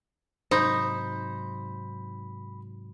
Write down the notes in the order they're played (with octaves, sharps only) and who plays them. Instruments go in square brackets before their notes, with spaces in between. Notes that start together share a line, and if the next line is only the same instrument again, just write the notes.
[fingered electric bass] G#2 C3 F#3 [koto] D#4 [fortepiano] C5 [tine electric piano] B5